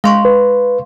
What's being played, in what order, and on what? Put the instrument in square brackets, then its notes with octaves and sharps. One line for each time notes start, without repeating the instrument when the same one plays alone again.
[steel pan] G#3 [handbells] F5 C6 C#6
[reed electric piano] B4